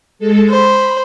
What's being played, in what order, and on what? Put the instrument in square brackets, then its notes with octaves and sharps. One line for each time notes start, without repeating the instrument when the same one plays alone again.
[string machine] G#3 A4
[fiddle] C5 [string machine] B5